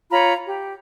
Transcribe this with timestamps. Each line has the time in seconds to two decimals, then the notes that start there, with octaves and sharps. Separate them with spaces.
0.11 F4 C#5 A#5 B5
0.45 G4